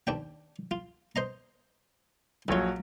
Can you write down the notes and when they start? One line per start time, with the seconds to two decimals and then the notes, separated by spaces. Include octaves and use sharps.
0.07 D#2 D4 G5
0.71 F4
1.16 C5 D#5 A#5
2.48 A#1 D3 F#3 F4 C#5